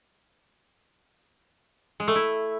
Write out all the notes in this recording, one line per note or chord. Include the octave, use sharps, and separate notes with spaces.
G#3
A3
E4